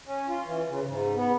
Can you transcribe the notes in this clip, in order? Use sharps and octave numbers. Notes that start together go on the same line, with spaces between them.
C#4
F4
E3
C#3
G#2
B3